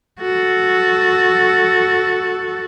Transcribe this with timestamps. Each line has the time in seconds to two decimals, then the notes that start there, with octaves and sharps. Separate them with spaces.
0.21 F#4 A4